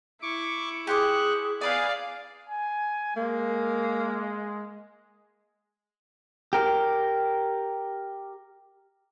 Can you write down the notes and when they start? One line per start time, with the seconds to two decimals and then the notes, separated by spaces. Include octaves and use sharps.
0.22 E4 C#6 D6
0.87 G4 G#4 C5 C#6 D6 F#6
1.61 B3 G#4 B4 D5 F5 G#5
2.49 G#5
3.17 G#3 A#3
6.53 G4 A#4